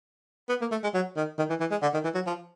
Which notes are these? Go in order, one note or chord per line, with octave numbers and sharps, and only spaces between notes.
B3
A#3
A3
G#3
F#3
D#3
D#3
E3
E3
G#3
D3
D#3
E3
F#3
F3